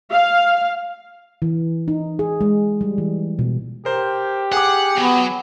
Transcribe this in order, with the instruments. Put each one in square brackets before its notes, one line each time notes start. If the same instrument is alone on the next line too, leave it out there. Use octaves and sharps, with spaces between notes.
[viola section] F5
[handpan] E3
D#4
G#4
G#3
G3
E3
B2
[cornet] G4 [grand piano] A#4 C5
[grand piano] G#4 D6 [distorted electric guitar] F#5
[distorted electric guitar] F#3 [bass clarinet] B3